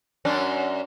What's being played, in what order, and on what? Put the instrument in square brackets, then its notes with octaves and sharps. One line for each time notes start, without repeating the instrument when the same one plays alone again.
[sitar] F#2 C#4 D4